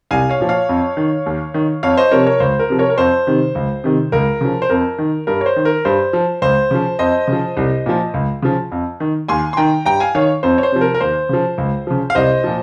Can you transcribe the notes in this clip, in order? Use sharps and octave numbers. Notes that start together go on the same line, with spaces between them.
C2 F5 G#5
C#5 F5
A#2 F3
C#5 F5
F2
D#3
D#2
D#3
F2 C#5 F5
C5 D#5
C3 F3 A#4 C#5
A#4 C#5
C#2 C5
A#4
C3 F3
A#4 C#5
A#4
F2 C5
C3 D#3
C#2
C3 D#3
C#2 A#4
C#3 F3
C5
F2 A#4
D#3
G2 A#4
C#5
C5
D#3
A#4
G2 C5
F3
C#2 C5
C#3 F3
F2 C5 D#5
C#3 F3
C2
A#2 F3
C#2
C#3 F3
F2
D#3
D#2 G#5 C6
C6
D#3 G5 A#5
G2 G5 A#5
F5 G#5
D#3 C#5 F5
F2 C5
C#5
C5
C3 F3
A#4
A#4
D#2 C5
C#3 F3
C#2
C#3 F3
F5
C2 C5 D#5
A#2 F3